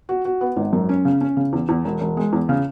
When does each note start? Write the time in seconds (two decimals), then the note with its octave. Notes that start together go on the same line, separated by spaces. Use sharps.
0.09 F#4
0.25 F#4
0.41 B3
0.56 G#1
0.73 F#2
0.89 C#4
1.05 C#3
1.21 C#4
1.37 C#3
1.53 E2
1.69 E2
1.85 E1
2.01 E1
2.17 G#3
2.33 E2
2.49 C#3